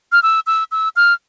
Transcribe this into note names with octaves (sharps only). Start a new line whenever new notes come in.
F6
E6
E6
E6
F6